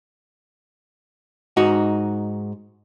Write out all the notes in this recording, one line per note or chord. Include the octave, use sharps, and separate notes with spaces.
G#2 D#4 F#4